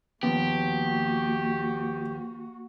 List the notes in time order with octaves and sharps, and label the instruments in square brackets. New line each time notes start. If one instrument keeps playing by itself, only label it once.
[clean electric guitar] D#2 F3 [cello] A#3 F#4 [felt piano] B3 [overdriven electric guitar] G4